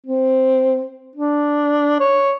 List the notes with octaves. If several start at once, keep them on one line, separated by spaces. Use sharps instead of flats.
C4
D4
C#5